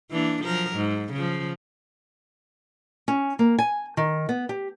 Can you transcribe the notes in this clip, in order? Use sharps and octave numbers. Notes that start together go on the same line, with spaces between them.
E3 A#3 D4
F3 F#3 A#4
G#2
C#3 F3
C#4
A#3
G#5
D#3
B3
G4